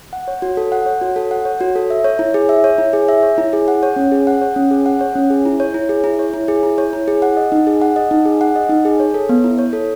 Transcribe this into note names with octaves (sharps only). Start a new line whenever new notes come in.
F#5
C#5
F#4
A4
F#5
C#5
F#4
A4
F#5
C#5
F#4
A4
E5
C#5
E4
G#4
E5
C#5
E4
G#4
E5
C#5
E4
G#4
F#5
C#5
C#4
G#4
F#5
C#5
C#4
G#4
F#5
C#5
C#4
G#4
E4
C#5
E4
G#4
E4
C#5
E4
G#4
E4
C#5
E4
G#4
F#5
D#5
D#4
G#4
F#5
D#5
D#4
G#4
F#5
D#5
D#4
G#4
C#5
A4
B3
E4
C#5
A4